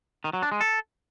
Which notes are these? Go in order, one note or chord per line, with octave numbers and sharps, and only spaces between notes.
D#3
F#3
D4
G#3
A4